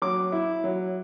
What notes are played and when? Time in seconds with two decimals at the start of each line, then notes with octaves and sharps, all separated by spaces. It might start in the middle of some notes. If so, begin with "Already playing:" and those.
0.02 F#3 D6
0.32 E4
0.64 F#3